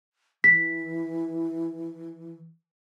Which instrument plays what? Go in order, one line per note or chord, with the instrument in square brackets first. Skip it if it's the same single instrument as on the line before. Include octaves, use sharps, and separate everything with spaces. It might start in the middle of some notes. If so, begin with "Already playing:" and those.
[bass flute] E3 [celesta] B6